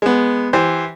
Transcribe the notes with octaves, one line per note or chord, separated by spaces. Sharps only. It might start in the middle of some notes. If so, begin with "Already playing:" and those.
G#3 B3
E3 G4 C5